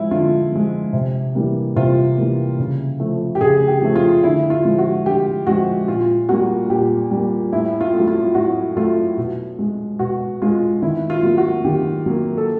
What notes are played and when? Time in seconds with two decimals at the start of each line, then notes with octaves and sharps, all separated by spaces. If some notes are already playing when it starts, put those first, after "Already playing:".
Already playing: F3 G#3 E4
0.11 D3 F4
0.52 F3 G#3
0.93 C3
1.35 E3 G3 A#3
1.76 C3 F4
2.17 E3 G3 A#3
2.59 C#3
3.00 F3 A3
3.35 G4
3.41 C#3 G#4
3.68 G4
3.82 F3 A3
3.96 F4
4.23 D3 E4
4.50 F4
4.65 F3 G#3
4.78 F#4
5.06 D3 G4
5.47 F3 G#3 F#4
5.88 A#2 F4
6.29 G3 A#3 F#4
6.70 A#2 G4
7.11 G3 A#3
7.53 A2 E4
7.81 F4
7.94 F#3 A3
8.08 F4
8.35 A2 F#4
8.77 F#3 A3 F4
9.17 B2
9.59 G#3
9.99 B2 F#4
10.42 G#3 F4
10.82 D#3 E4
11.10 F4
11.23 F#3 A#3
11.37 F#4
11.65 D#3 G4
12.06 F#3 A#3
12.37 A4